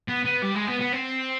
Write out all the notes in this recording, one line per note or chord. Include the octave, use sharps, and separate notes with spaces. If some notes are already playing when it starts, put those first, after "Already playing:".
B3
B3
G3
G#3
B3
B3
C4